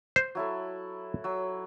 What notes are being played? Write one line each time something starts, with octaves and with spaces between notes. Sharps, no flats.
C5
F#3 E4 A4
F#3 E6